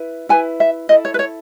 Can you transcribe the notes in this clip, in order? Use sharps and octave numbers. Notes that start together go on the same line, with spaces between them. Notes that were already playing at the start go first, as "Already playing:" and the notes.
Already playing: E4 B4
E4 B4 G#5
E5
E4 A4 D#5
C#5
B4
C#5